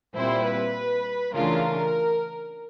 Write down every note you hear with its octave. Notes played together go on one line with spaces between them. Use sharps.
A#2 G3 C4 E4 C5
B4
C#3 E3 A3 D4 F4 A#4